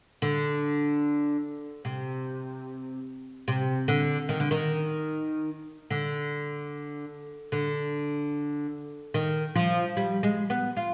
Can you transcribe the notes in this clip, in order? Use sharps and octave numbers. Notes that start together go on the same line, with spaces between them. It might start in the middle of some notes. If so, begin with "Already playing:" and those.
D3
C3
C3
D3
D#3
D3
D#3
D3
D3
D#3
F3
G3
G#3
B3
F4